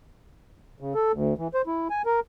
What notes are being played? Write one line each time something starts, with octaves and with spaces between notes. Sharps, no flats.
C#3
A4
D2
E3
C5
E4
G#5
A#4